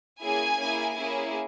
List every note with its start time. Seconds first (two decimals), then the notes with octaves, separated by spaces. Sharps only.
0.21 A#3 C#4 E4 G#4 G#5
0.58 A#3 E4 G#4
0.96 A#3 C#4 E4 G#4